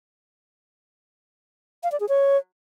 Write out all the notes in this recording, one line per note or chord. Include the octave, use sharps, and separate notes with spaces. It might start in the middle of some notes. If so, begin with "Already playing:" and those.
F5
D5
G#4
C#5